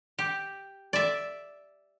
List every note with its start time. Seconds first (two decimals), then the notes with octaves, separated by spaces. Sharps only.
0.19 G4
0.93 D5 E5